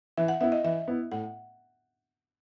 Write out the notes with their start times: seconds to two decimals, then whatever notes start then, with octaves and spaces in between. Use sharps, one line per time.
0.18 E3 E5
0.28 F#5
0.41 B3 E4 E5
0.52 D#5
0.64 E3 E5
0.88 B3 E4
1.11 A2 F#5